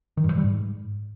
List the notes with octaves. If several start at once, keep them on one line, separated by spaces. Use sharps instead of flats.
D#3
G2
E3
G3
G#2